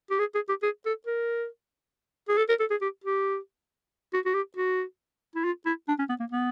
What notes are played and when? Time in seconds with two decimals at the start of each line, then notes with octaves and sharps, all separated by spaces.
0.10 G4
0.19 G#4
0.35 G#4
0.48 G4
0.62 G#4
0.85 A4
1.06 A#4
2.28 G#4
2.37 A4
2.49 A#4
2.60 A4
2.70 G#4
2.81 G4
3.04 G4
4.13 F#4
4.25 F#4
4.34 G4
4.56 F#4
5.35 E4
5.44 F4
5.66 E4
5.88 D4
5.99 C#4
6.09 B3
6.20 A#3
6.31 B3